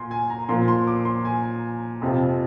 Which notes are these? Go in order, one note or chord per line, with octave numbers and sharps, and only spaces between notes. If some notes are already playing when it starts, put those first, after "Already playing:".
Already playing: A#2 G#5 C6
G#5
A#5
A#2 F3 C6
C6
D6
C6
G#5
F2 C3 F3